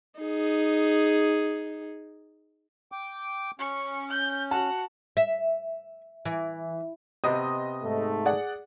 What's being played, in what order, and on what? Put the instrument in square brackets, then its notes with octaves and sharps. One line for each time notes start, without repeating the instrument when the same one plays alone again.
[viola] D#4 G#4
[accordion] G5 D6
[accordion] C#4 [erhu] C#6
[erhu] G6
[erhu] F#4 [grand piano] A5
[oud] E5
E3
[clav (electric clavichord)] C3 B3 C4 [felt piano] D#5 D#6
[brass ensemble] G#2 A3
[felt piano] G#4 D5 F#5